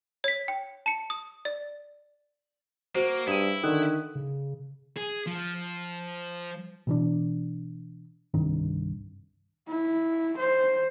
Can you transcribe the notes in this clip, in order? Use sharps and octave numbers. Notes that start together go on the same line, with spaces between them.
C#5 B6
G5
A5 C#7
D#6
D5
A#3 F#4 C5
G2 E4 D#6 D#7
D3 D#3 D#6 F#6
C#3
G#4
F3
B2 E3 D4
C2 G2 D#3
E4
C5